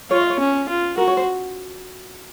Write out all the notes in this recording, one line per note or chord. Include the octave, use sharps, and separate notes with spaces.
F4 C#5
D#5
C#5
C#4
F4
F#4 A#4
C#5
C5